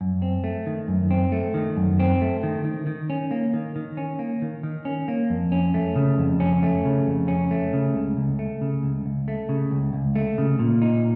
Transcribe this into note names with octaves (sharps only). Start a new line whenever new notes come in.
F#2
C4
A3
D#3
F#2
C4
A3
D#3
F#2
C4
A3
D#3
D#3
D#3
C#4
A#3
D#3
D#3
C#4
A#3
D#3
D#3
C#4
A#3
F2
C#4
A3
C#3
F2
C#4
A3
C#3
F2
C#4
A3
C#3
C#2
C#2
A3
C#3
C#2
C#2
A3
C#3
C#2
C#2
A3
C#3
A#2
D#4